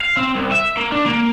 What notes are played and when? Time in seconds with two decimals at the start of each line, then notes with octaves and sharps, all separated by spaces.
0.01 F5
0.17 C4
0.36 C2
0.52 E5
0.77 A#3
0.92 D4
1.06 A#3